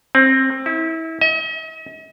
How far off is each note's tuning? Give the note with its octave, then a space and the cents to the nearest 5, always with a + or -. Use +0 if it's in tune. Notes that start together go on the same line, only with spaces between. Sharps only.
C4 +20
E4 -30
D#5 +45